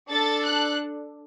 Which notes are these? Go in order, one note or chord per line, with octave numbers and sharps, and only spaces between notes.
D4 A4 A6
F#6